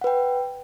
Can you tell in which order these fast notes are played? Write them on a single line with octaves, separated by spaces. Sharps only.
F#5 B4 G5